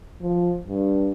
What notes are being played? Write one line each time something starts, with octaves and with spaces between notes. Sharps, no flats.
F3
G2